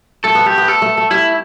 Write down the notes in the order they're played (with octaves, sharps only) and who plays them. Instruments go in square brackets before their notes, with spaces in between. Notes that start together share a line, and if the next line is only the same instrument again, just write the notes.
[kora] A3 [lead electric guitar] A4
[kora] B3
[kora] A3 [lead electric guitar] G4
[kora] B3
[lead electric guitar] A4
[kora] A3
A3
[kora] G3 [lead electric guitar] E4